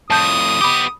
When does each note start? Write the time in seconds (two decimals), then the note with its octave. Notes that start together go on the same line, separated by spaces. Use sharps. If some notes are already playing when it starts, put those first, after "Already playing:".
0.10 F2 A2 A5 D#6 G6
0.61 B3 G4 B5 D6